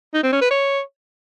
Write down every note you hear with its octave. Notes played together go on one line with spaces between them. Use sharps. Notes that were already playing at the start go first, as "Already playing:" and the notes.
D#4
C4
C#4
B4
C#5